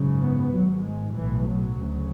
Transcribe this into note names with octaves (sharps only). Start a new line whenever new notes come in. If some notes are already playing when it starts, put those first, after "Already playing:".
Already playing: G#1 F#2 C#3
B3
G#1 G#2 F#3
G#3
B1 A2 E3
F#3
D2 C#3